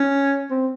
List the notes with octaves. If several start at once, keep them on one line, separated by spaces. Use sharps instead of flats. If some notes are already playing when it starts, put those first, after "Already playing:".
Already playing: C#4
C4